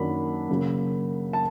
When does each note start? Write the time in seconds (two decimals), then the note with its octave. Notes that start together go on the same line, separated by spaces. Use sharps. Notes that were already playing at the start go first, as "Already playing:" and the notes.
Already playing: F#2 D#3 F#3 A#3 D4 B5
0.49 C#3 F#3 A#3
1.33 A5